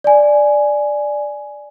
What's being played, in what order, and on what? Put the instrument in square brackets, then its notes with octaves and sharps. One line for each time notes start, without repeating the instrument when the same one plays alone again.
[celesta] D5 G#5